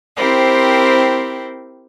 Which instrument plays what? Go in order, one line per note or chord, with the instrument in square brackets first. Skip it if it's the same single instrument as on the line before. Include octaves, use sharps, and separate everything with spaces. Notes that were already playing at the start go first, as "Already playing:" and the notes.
[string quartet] C4 E4 G4 A#4 C5